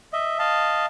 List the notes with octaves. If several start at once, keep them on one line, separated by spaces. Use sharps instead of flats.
D#5 E5
D#5 F5 A5